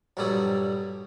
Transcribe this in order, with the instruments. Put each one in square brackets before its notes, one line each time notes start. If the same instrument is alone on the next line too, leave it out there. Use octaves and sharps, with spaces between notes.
[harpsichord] A#1 G2 F#3 G3 A4 D#6